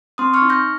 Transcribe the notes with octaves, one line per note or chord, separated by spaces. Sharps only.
C4 C6 D#6
C#6 F6
D#4
G6 A#6